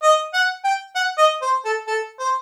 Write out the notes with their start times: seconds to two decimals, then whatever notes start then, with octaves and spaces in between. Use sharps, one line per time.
0.03 D#5
0.34 F#5
0.64 G5
0.95 F#5
1.18 D#5
1.42 C5
1.65 A4
1.87 A4
2.19 C5